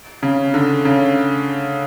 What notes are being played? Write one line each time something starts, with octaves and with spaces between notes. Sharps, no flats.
C#3
D3
C#3